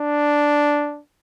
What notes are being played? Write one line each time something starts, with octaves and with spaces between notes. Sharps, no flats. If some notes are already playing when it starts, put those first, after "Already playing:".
Already playing: D4